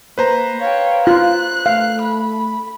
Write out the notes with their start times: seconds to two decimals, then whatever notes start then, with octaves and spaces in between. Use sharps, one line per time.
0.18 A#3 B4 C5 A#5
0.60 C#5 F5 G5
1.07 F4 F#6
1.66 A3 F5
2.01 B5